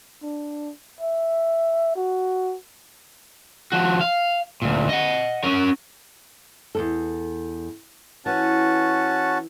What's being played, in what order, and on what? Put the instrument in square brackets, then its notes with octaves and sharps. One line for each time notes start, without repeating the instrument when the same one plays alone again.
[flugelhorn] D4
E5
F#4
[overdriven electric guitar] F3 F#4
F5
D2 A#2
D#5 F#5
C#4 A#4
[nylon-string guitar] E2 G2 A4
[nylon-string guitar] E3 [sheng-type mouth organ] C#4 F#4 A5